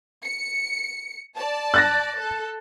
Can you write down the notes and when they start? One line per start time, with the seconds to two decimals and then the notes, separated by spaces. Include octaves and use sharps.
0.25 C#7
1.36 D5 A5
1.74 F#6 A6 A#6
2.19 A4